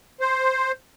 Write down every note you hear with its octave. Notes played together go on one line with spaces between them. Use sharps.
C5